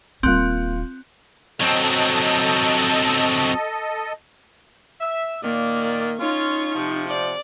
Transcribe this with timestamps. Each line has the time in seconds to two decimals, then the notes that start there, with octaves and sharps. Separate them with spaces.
0.23 D#1 G3 A#3 C4 F4 F#6
1.60 F#3 C4 A4 D#5
5.01 E5
5.43 A#2 D#3 A#3 D5
6.20 C#4 D#4 F4 C#6
6.75 C3 F3
7.08 D5